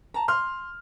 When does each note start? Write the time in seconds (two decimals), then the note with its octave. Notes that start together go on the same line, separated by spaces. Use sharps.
0.14 A5 A#5
0.28 C6 F6